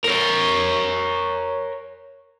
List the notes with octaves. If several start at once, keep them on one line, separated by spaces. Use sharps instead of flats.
A#4 C#5